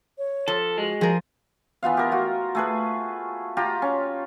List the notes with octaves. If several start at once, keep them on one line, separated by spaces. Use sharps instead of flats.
C#5
F3 A4
G#3 F#4
F3 G#4 A#4
E3 B3 F4 F5
G4 A#4
F4 F#4
A3 G#4 B4
F4 G4 A#5
C#4